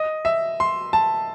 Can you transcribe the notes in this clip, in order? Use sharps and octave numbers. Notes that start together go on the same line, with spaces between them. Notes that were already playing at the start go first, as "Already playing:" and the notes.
Already playing: D#5
E5
C6
A5